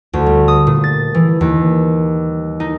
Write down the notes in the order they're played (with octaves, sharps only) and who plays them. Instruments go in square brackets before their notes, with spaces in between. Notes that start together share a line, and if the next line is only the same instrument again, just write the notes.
[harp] D2
G3
D#6
A#2
A6
E3
D#2
D#4